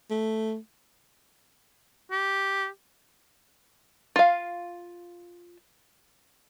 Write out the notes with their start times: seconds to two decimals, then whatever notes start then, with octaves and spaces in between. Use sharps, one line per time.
0.11 A3
2.11 G4
4.16 F4 F5